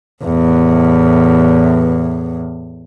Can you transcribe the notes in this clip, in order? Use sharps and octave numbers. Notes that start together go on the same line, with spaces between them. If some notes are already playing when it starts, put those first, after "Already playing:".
E2 A2